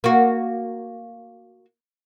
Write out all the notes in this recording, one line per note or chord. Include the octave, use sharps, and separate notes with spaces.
A#3 F#4